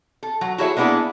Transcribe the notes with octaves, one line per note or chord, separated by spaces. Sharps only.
A4
F#3
E4 F#4 G#4 A4 C#5 E5
G#3 A#3 B3 D4 E4 G#4